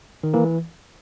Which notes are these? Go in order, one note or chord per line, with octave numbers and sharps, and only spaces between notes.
D#3
E3 A#3